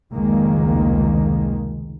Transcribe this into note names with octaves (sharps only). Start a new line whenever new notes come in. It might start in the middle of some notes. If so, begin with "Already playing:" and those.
F1 C#2 D#3 G#3 A#3